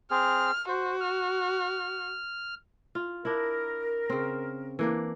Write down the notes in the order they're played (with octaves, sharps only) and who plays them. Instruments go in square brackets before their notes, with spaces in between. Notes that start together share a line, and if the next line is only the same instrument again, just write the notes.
[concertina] C4 G#4 [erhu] F6
[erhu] F#4 [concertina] C5
[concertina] F6
[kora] F4
[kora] D4 E4 [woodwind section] A#4
[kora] C#3 C4
E3 A#3 D4